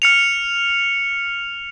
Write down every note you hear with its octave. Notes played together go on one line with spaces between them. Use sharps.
F6 C#7 F7